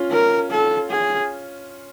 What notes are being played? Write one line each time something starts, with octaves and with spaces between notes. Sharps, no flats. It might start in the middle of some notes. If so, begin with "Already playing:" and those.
Already playing: C#4 F4
A#4
A4
G#4